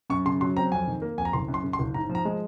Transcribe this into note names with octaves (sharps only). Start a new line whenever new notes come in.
F#2 C#6
C#3 C6
F#3 C6
C4 A#5
F2 G#5
D#3
A#3
F2 G#5
A#5
F#1 C6
F#2
C6
C#3
C6
F#1
G#2 A#5
F3
A#5
G#3